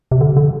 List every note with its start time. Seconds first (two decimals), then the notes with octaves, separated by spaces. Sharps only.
0.11 C3
0.21 D3
0.37 D3